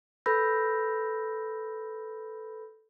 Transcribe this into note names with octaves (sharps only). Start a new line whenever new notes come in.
A4 B4 B5 E6 G6 A#6